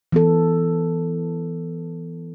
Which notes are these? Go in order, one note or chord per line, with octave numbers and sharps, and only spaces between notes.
E3 B3 A4